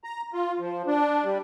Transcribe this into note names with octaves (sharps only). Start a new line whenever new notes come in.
A#5
F4
F3
D4
G3